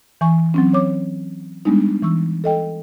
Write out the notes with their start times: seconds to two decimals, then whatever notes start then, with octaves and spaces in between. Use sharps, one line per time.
0.21 E3 G#5 C#6
0.54 F#3 C4 C#4
0.73 C#5 D6
1.65 G3 G#3 B3 D4 D#4
2.02 E3 C#6 E6
2.44 A4 D#5 G5